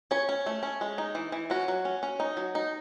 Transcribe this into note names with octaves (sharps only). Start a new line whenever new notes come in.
C#4 C#5
C#4
A3
C#4
G#3
D#4
E3
E3
C#4 F#4
F#3
C#4
C#4
D#4
F#3
D#4